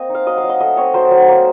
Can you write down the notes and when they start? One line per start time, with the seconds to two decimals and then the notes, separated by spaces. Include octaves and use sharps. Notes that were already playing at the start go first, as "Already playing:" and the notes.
Already playing: A#3 C4 D#5
0.10 D#4
0.15 F5
0.26 F#3 D#5
0.38 F5
0.43 F#3
0.49 D#5
0.61 A3 D#5
0.77 C4 C#5
0.94 F#3 C5
1.11 F#3
1.28 A#3